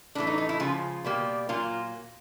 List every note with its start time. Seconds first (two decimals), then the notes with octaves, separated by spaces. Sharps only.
0.15 A2 E3 A3 D4
0.27 D#4
0.38 D#4
0.49 E4
0.60 C#3 F3 G#3 F4
1.04 B2 G3 A#3
1.49 A#2 F#3 A#3 F4